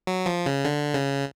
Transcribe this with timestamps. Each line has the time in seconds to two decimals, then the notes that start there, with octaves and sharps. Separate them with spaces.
0.07 F#3
0.26 F3
0.46 C#3
0.65 D3
0.94 C#3